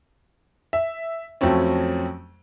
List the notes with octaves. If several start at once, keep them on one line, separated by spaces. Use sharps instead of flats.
E5
F2 F#3 A3 C4 C#4